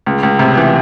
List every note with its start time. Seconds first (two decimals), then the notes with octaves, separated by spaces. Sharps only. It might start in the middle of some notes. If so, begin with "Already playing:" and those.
0.06 C#2
0.23 C#2
0.39 C3
0.57 E3